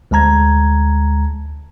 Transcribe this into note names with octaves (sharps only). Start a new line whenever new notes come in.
D2 G#3 A5 A#5 G#6